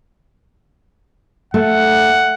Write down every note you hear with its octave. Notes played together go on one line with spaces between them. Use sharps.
A3 F#5